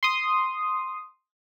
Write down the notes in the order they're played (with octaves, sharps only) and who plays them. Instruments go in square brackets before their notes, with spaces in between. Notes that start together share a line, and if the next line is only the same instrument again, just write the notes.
[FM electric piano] C6 D#6